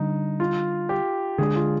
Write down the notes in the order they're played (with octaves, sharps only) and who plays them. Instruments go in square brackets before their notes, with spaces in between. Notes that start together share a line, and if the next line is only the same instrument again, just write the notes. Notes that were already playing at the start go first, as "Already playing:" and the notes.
Already playing: [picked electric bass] D3 G3 [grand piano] D#4
[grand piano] F4
G4
[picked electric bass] D3 G#3 D4 [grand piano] G#4
[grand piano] F4